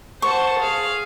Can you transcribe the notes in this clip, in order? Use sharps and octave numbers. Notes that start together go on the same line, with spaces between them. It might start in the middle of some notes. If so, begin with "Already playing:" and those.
C5 F#5 A5 C#6
G#4 F5